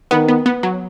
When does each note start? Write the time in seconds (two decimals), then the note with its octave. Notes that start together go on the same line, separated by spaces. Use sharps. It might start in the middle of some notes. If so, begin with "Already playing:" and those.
0.11 D#3 B3
0.29 B3
0.46 B3
0.63 F#3